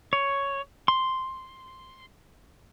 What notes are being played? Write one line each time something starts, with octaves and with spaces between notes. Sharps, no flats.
C#5
C6